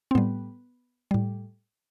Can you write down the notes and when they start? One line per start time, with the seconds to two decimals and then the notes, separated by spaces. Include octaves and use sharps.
0.11 C4
0.15 A2 G3 B3
1.11 A2 G3